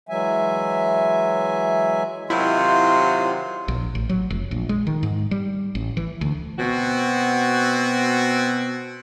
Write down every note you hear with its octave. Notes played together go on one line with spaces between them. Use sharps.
E3 F#3 G#3 E5 G#5
C3 D#3 F#3 E4 F4 F5 F#5 C6
A#1
A1
F#3
F1
A#1
G#3
D#3
G#2
G3
A1
E3
D2
B2 C4 F#4